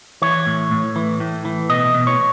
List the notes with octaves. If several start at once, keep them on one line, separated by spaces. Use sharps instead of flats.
E3 C#5
A2
A2
E3
A2
E3
B2 D#5
B2
C#5